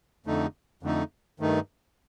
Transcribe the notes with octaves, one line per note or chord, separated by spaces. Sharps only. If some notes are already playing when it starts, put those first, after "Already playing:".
F2 D3 A3 D#4
F2 D3 A3 D#4
G2 D#3 A3 D#4